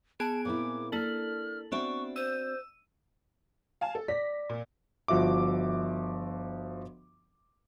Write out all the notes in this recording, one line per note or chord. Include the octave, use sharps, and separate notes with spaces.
B3 G#4 G#5 A5 D7
A#2 C4 E4 D6
A#3 D4 E4 A4 A#4 F6 F#7
B3 C4 D4 F#4 D5 E5 C#6
C5 E6 D#7
F5 G#5 A5
A4
D5 A#6 B6
A#2
G1 F3 F#4 E5 D6